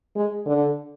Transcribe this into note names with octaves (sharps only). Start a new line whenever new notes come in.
G#3
D3